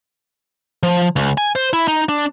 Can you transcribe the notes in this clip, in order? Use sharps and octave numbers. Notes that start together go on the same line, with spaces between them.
F3
C#2
G#5
C5
E4
D#4
D4